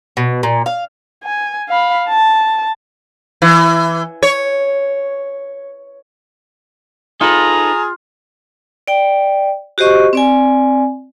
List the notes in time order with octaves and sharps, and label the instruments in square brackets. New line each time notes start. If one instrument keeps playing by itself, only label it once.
[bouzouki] B2
A#2
F5
[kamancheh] G#5
F5 B5
A5
[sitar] E3
C#5
[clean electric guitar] D#4 A4 B4 [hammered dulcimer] F4 [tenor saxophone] G#4 [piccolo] A#5
[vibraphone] D5 G5
F#4 G4 C5 D#5 C#6
C4 D5 G#5